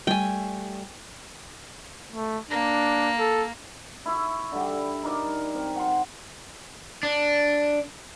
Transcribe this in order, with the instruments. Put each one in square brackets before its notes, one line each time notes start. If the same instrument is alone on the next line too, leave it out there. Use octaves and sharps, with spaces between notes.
[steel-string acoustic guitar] G3 A3 [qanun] G5 G#5
[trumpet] A3
[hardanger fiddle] A#3 [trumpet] D4
[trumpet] A4
[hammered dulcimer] E4 E5 C#6
D3 G3
D#4 A#4 D5
C4
F#5 C6
[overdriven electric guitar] D4